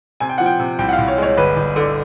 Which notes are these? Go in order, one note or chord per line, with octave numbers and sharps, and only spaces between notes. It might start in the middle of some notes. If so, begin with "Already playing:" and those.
C3 G#5
G5
F3 F#5
G5
C3
C2 G5
F#5
F5
C2
C#5
G#3 C#5
G1 B4
G1
D3